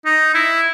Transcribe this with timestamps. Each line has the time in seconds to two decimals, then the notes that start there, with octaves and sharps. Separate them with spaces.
0.05 D#4
0.34 E4